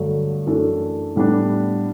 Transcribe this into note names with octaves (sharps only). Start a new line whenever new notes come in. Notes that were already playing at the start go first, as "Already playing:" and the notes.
Already playing: G2 D3 F#3 A3
F#2 E3 A3 D4 A4
A2 G3 B3 D4